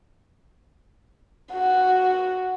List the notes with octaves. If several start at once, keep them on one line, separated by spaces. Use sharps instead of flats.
F#4